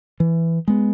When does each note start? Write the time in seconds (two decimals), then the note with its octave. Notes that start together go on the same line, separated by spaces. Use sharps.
0.20 E3
0.68 G#3 B3